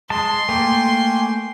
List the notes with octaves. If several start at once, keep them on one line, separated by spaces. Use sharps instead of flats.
G#3 A5 C6
A3 A#3 G5 G#5